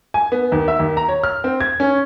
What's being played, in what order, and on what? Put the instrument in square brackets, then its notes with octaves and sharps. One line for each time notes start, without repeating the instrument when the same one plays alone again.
[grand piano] G#5
B3
D#2
E5
D#2
A#5
C#5
F6
C4
G#6
C#4